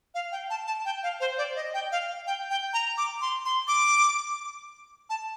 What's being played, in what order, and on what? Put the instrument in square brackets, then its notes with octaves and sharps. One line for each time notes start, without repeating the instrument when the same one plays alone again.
[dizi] F5
G5
A5
A5
G5
F5
C5
D5
D#5
G5
F5
G5
G5
A#5
D6
C6
C6
D6
A5